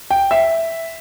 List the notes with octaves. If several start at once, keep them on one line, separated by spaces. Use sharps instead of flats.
G5
E5